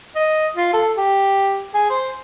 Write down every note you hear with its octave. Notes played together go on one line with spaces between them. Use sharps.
D#5
F4
A4
G4
G#4
C5